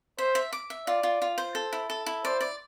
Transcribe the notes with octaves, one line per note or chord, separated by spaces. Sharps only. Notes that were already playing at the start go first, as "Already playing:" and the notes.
C5 E5
E5
D6
E5
F4 D5
F4
F4
C5
A4
E4
A4
E4
C5 D5
D5